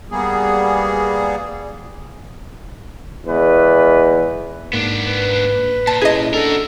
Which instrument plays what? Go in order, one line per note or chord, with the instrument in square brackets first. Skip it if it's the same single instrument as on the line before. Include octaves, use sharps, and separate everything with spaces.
[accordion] G3 A#3 B3 G#4
[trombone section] E2 G#3 B4
[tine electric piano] G#2 A#3 [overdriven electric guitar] B3 D4
[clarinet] B4
[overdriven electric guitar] A#2 [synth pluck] A5
[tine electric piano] C#4 E4 [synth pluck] G#4 D#5
[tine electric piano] D4 [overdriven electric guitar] F#4 A#4 [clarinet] A4